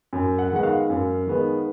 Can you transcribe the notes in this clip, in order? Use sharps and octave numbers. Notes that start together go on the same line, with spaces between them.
F#2
F#5
D#3 G#3 B3 F#5
F5
F#2
D#3 G#3 B3